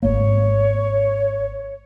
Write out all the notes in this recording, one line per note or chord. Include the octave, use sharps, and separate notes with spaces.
G#1 A#3 C#5